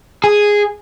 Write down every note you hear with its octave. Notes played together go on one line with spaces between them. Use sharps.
G#4